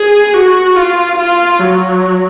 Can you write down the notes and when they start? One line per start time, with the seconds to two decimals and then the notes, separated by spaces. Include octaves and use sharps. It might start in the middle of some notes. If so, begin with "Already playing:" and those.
Already playing: G#4
0.34 F#4
0.76 F4
1.18 F4
1.60 F#3